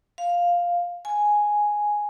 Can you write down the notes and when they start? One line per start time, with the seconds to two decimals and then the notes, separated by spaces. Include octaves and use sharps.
0.18 F5
1.05 G#5